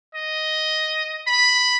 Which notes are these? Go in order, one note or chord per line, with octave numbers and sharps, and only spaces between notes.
D#5
B5